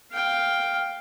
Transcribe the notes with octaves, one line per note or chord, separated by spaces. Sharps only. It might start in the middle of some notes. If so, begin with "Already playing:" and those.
F5 G5